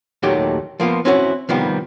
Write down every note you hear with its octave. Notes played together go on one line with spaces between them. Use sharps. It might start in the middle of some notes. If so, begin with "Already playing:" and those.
D#2 A#2 D#3 F#3 A3 G4
F3 A#3 B3 F4
C4 C#4 E4 F#4 A#4 C#5
C3 D#3 F3 G3 B3